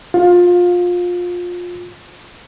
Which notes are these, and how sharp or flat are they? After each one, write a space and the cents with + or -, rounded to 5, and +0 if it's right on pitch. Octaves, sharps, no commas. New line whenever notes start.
F4 +20